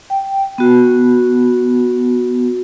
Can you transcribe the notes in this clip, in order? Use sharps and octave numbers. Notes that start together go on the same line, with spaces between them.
G5
B3 F#4